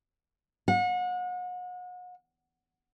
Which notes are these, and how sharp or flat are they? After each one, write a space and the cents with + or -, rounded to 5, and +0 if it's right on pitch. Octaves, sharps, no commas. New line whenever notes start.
F#5 -35